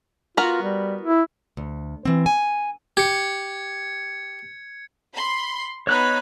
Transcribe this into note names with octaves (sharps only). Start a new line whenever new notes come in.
B3 F4 F#4 A#4
G3
E4
D2
E3 C4
G#5
G4 G#6 C#7
B5 C6
B3 D#4 C#5 B5 F#6